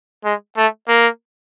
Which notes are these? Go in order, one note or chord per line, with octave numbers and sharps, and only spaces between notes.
G#3
A3
A#3